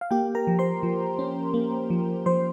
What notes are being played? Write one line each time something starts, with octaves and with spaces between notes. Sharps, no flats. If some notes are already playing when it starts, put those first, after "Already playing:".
F5
A#3 G4 G5
A#4 A#5
F3
C5 C6
F3
C#4
A#3
F3
F3 C5 C6